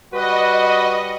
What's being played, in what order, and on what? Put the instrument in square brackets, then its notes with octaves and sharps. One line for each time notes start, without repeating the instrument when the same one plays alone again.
[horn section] G3 B4 [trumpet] F#4 [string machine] D#5